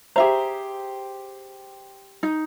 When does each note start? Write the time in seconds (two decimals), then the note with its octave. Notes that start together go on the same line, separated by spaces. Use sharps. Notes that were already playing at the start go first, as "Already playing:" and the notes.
0.16 G4 G#4 C5 E5 A#5
2.23 D#4